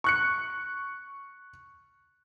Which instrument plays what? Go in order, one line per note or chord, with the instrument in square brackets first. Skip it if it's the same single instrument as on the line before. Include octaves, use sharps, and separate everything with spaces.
[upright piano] C#6 F#6 C#7